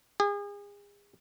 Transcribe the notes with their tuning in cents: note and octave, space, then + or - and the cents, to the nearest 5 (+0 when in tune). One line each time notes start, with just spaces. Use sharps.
G#4 -35